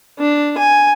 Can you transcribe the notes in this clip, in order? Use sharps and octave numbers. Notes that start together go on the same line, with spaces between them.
D4
G#5